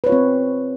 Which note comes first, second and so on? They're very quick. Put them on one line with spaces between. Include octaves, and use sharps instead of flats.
B4 C#5 F4 C4